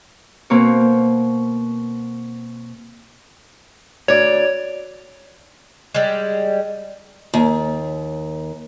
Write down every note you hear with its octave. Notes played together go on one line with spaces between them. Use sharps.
B2 A#3 C4 C#5
D2 C#5 D5
G3 G#3
D#2